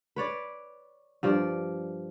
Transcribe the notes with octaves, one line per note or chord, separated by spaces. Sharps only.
B4 C#5 D5
G2 F3 D5